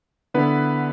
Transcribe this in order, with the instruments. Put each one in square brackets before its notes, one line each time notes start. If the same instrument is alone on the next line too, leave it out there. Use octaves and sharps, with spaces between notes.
[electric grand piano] D3 B3 E4 B4